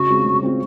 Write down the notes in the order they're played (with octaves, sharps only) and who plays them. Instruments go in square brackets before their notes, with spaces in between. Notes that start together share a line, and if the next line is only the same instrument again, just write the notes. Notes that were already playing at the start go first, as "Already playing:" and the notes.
Already playing: [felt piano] C#3 [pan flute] F#4
[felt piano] G#3 C4 F4
C#3
G#3 C4 F4